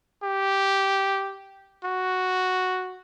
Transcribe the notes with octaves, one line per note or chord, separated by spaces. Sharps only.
G4
F#4